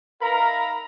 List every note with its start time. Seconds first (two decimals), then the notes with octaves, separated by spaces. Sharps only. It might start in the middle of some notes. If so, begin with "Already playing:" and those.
0.22 D#4 A#4 E5 F5 A#5 B5